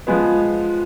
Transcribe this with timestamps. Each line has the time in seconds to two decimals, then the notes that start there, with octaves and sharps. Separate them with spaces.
0.07 F3 G#3 B3